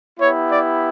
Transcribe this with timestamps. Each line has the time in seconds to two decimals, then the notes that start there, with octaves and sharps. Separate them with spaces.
0.20 B3 E4 G4 C#5
0.50 D5